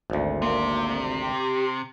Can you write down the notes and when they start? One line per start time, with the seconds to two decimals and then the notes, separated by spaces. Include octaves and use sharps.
0.10 G#1 D2
0.42 C3 A#3
1.22 G4